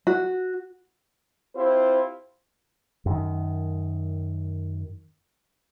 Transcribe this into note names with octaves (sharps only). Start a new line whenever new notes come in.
F#4
C4 E4 F4 G4 C5
F#2 D#3